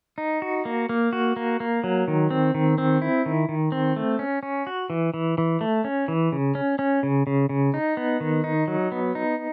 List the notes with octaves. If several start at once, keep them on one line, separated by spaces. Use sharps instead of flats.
D#4
F#4
A#3
A#3
F#4
A#3
A#3
F#3
D#3
C4
D#3
C4
E4
D#3
D#3
C4
A3
C#4
C#4
F#4
E3
E3
E3
A3
C#4
E3
C#3
C#4
C#4
C#3
C#3
C#3
D#4
B3
D#3
D#4
F#3
B3
D#4